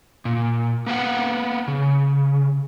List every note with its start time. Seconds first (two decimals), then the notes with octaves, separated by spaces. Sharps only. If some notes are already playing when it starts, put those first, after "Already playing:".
0.25 A#2
0.86 A#3 B3 F5 F#5
1.68 C#3